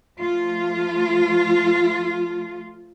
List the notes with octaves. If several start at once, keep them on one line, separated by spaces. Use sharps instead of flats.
F3 A3 F4